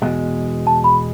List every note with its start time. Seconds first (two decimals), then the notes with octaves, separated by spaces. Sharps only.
0.02 E2 B2 G#3
0.67 A5
0.84 B5